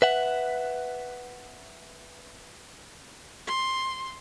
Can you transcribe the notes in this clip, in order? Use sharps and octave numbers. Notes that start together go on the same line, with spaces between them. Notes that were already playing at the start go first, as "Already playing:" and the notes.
B4 E5 F#5
C6